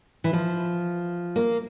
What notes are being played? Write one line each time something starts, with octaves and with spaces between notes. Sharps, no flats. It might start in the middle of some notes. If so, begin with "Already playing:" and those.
E3
F3
A#3